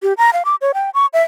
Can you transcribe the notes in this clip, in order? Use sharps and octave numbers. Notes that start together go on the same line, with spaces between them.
G4
A#5
F5
D6
C#5
G5
C#6
E5